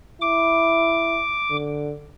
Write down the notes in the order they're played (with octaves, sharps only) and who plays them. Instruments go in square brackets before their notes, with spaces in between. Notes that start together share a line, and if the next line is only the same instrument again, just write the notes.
[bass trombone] E4 [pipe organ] D6
[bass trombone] D3